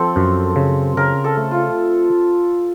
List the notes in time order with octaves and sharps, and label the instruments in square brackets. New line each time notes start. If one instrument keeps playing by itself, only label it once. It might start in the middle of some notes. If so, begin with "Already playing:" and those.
Already playing: [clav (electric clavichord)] F3 [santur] C4 A4
[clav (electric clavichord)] F#2
C#3
[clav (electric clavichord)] C#3 [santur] A#4
[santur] A4
[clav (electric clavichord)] A3
[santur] F4